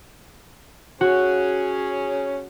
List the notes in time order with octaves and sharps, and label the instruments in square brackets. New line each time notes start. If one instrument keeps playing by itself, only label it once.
[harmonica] C#4 G#4 C#5 [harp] F#4